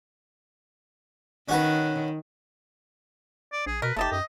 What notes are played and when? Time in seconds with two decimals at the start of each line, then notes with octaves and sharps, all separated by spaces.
1.49 D#3 C#4 F#4 B4
3.52 D5
3.66 A#1 G#4
3.82 B2 A#4 B4
3.96 F#1 A3 D#4 G4 A5
4.12 F#2 D#5